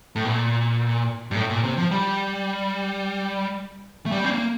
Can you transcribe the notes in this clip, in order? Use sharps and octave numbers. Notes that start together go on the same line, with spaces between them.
A2
A#2
G2
A2
A#2
C3
F3
G3
A3
G3
C4
A#3